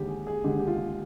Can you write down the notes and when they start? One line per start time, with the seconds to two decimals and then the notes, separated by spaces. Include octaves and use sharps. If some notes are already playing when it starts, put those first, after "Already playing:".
Already playing: D#2 D3 G#3 G4
0.08 G#4
0.27 G#4
0.44 D#2 D3 G#3 G4
0.59 G4
0.67 F4